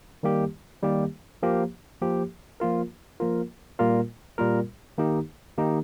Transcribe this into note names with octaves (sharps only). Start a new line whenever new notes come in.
D#3 G3 A#3 G4
D#3 G3 A#3 G4
F3 A#3 G4
F3 A#3 G4
F3 A#3 F4 A#4
F3 A#3 F4 A#4
A#2 G3 A#3 F4 A#4
A#2 G3 A#3 F4 A#4
D#3 A#3 D#4 G4
D#3 A#3 D#4 G4